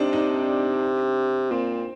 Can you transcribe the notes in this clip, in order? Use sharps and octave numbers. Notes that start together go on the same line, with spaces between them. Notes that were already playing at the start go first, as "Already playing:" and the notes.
Already playing: C3 C4 D4 D#4
D#4
A#2 C4